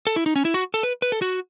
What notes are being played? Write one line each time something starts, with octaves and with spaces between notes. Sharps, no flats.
A4
E4
D#4
C#4
E4
F#4
A4
B4
B4
A4
F#4